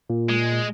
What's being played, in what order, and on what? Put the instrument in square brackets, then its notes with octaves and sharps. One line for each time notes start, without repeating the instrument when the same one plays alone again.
[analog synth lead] A#2
[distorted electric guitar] G#3